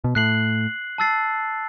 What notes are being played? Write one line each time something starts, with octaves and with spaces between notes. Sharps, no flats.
B2
A2 F#6 C7 F#7
A5 E6 A6 C7